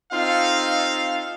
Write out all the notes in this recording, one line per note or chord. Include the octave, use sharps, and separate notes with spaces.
C4 D#4 F4 A4 F5